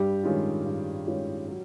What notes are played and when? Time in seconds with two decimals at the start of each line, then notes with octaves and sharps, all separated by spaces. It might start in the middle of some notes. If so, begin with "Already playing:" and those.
Already playing: G2 G3 G4
0.23 D#3 G#3 C#4 F4
0.65 G2
1.07 D#3 G#3 C#4 F4
1.48 F#3